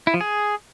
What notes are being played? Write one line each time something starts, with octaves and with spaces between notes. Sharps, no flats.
E4
F3
G#4